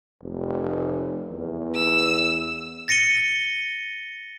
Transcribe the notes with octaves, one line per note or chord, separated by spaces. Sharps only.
F1
E2
E6
A6 A#6 C#7 D#7 G7